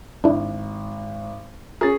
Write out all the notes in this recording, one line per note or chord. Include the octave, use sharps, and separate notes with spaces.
G#1 D4 E4
C#4 G#4 A#4 A6